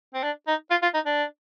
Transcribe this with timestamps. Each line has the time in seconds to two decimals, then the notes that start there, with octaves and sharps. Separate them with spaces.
0.14 C4
0.23 D4
0.47 D#4
0.71 F4
0.82 F4
0.94 D#4
1.06 D4